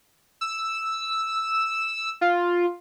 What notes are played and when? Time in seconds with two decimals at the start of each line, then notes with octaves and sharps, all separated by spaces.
0.41 E6
2.21 F4